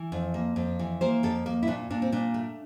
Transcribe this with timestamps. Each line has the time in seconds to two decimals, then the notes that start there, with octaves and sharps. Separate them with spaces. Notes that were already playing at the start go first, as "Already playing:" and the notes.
Already playing: E3
0.12 F2
0.34 A#3
0.56 F2
0.79 E3
1.01 A#3 C5
1.23 F2 A4
1.46 A#3
1.63 E4
1.67 A#2 D4
1.90 A#2 D4
2.02 C4
2.12 A#2 D4
2.34 A3